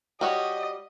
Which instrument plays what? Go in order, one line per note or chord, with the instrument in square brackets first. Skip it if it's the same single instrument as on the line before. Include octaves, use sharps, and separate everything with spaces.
[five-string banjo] G3 F#4 C#5 [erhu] D#5